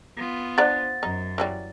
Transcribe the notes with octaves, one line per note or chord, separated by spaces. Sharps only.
B3 F4
D4 C5 D5 F#5 A#5 A6
F#2 D#4
E3 F#3 G3